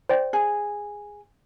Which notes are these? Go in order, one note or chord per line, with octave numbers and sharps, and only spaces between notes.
C5 D5 G5
G#4